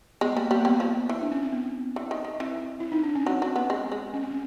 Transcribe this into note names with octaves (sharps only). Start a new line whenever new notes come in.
G#3 B3
G3 A#3
G3 A#3
A#3
G3 B3
F3
E3
D4
C#4
C4
B3
E3
D#3
D#3
E3 C4
E4
D#4
D4
C#4
F#3 C4
F#3
B3
G#3
G#3
C#4
C4
C#4